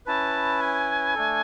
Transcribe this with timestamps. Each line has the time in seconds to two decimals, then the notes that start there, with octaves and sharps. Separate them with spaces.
0.06 C#4 E4 B4 A5
0.61 G#5
1.15 A3 D4 A4